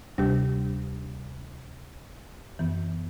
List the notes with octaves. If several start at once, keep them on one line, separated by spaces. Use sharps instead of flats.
D2 C3 G3 D4 G4
F#2 E3 B3